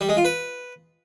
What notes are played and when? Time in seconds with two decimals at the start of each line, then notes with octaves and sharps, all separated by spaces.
0.01 G3
0.09 G#3
0.17 F4
0.25 B4